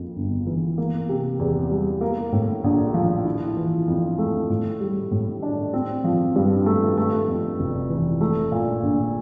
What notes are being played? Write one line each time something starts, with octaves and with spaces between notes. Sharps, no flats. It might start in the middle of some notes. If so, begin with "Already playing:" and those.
Already playing: F2 A#3
G1
E3
A#3
C3
E2
G3
A#3
A2
A#1
F3
E4
E3
F2
A3
A2
G3
A2
D4
C4
F3
G2
A3
A3
F2
F1
E3
A3
A#2
A#1